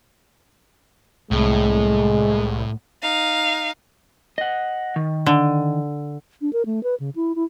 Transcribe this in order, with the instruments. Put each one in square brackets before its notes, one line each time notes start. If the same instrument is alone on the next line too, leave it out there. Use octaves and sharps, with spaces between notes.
[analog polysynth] C2 [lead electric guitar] A2 [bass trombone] G#3
[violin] D#4 F5
[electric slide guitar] D#5 F#5
D#3
[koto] D3
[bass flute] D4
A#4
A3
B4
C#3
E4
E4